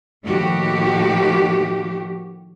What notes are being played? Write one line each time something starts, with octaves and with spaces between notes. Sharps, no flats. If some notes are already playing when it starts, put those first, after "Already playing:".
A2 D#3 F3 A#3 F#4 G4